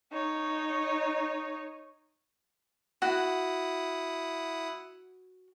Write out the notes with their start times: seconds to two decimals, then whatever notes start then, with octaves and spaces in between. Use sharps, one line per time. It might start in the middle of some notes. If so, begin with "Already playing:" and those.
0.12 D#4 C#5
3.02 E4 F#4 F#5 D#6